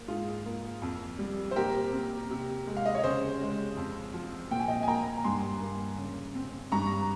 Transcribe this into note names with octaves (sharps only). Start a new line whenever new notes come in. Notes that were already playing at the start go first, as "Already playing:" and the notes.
Already playing: A#3
G#2 F4 G#4
A#3
F2
G3
C5
A#2 G4 A#4
C4
C3
G#3
F5
D#5
C#5
C#3 G#4 C5
G#3
F2
F3
A#2 G5
G#5
D#5 G5
G#5
A#3 G5 A#5
G2 G#5 C6
A#3
C#3
C4
G2 A#5 C#6